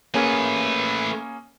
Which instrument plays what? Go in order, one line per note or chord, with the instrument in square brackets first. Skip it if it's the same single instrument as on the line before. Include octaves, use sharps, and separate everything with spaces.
[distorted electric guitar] A3 B4 [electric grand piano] A#3 C#4 G#4